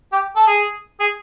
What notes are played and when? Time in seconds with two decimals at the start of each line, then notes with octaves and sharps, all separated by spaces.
0.12 G4
0.36 A4
0.47 G#4
1.00 G#4